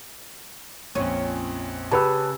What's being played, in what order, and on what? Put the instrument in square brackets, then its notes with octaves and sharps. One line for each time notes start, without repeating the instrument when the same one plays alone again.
[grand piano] A#1 F2 [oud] C#4
[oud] C#3 [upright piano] G4 B4 [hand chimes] A5 E6